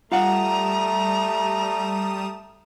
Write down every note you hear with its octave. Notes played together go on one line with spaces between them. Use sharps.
G3 A3 F4 F5 F#5 A#5 D#6 E7